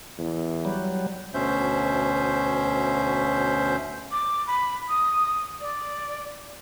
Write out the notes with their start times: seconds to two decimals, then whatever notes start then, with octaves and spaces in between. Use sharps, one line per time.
0.19 E2
0.65 F#3 G3
1.34 D2 B2 C#4 C5 E5 G6
4.12 D6
4.47 B5
4.88 D#6
5.61 D5